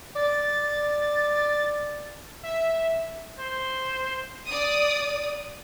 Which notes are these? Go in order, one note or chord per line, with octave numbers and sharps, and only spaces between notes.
D5 A6
E5
C5
D5 D#6